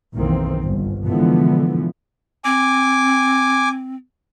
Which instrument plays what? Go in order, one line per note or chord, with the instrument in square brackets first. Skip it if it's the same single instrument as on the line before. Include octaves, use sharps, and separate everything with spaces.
[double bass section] B1 F#2 D#3 E3 A#3 C4
G1
B2 D3 E3 F3 G#3 B3
[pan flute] C4 [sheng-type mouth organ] G#5 D6